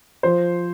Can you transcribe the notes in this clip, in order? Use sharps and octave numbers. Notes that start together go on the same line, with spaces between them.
F3 C5